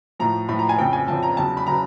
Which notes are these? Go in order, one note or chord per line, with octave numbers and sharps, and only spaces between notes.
A2 F3 A#5
A2 F3 B5
A#5
G#5
F2 C#3 F3 G5
G#5
F2 C#3 F3 A5
A#5
E2 C#3 F#3 A5
B5
C#3 F#3 A#5